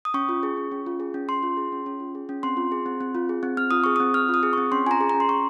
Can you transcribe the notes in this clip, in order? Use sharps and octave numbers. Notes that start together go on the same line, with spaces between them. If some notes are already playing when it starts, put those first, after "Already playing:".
D#6
C#4 C#6
F4
G#4
C#4
C#4
F4
G#4
C#4
C#4 C6
F4
G#4
C#4
C#4
F4
G#4
C#4
C4 C6
F4
G#4
C4
C4
F4
G#4
C4
C4 F6
F4 D#6
G#4 C#6
C4 D#6
C4 F6
F4
D#6
G#4
C4 C#6
C#4 C6
F4 G#5 A#5
G#4
C#4 A#5
C6
C#4 C#6